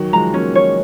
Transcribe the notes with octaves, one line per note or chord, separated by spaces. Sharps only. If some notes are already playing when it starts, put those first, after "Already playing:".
Already playing: D#3 F#3
F3 G#3 A#5
F#3 A#3 C#4
C#5